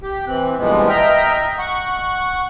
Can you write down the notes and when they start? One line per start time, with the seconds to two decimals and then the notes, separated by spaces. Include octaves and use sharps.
0.02 G4
0.27 E3 C4 F#6
0.59 G2 A#2 E3 F3 G#3 B3
0.89 D#5 E5 G5 A#5 F6
1.59 F#5 C#6